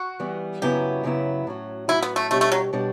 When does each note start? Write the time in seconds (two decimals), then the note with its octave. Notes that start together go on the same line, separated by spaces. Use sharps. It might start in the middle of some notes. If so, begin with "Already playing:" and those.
Already playing: F#4
0.20 E3 G3 B3
0.62 F#2 C#3 F#3 B3 E4 G4
1.03 F#2 C#3 F#3 B3 E4
1.47 A2 F#3 C#4 F#4
1.88 A2 F#3 C#4 E4 F#4
2.03 B3
2.16 A3
2.31 B2 G3 A3 D4 G4 C#5
2.41 A3
2.52 F#3
2.73 B2 G3 D4 G4 C#5